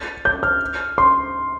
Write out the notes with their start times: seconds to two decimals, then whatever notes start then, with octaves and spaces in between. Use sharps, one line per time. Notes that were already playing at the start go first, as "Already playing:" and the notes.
Already playing: A6
0.25 G6
0.43 F6
0.98 C6